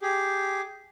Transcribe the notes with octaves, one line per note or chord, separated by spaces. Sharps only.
G4 G#4